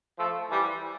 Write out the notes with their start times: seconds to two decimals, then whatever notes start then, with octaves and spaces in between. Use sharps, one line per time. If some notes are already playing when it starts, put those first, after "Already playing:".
0.17 F3 A3
0.49 E3 G3